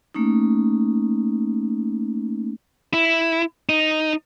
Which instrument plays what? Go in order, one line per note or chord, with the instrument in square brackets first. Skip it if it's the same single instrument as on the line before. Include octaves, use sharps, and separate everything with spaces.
[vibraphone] A3 A#3 C#4 D#4
[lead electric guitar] E4
D#4